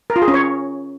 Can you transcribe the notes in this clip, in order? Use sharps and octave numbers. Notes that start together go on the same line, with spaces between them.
A#4
F4
G#4
C#4
C#5